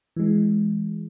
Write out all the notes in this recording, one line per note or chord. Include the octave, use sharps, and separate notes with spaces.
E3 G#3